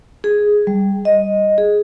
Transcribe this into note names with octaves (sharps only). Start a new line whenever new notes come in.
G#4
G3
D#5
G#4